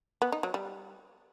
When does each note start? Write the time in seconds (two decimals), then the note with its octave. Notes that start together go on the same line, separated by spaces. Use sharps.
0.22 B3
0.32 D#4
0.43 F#3
0.54 G3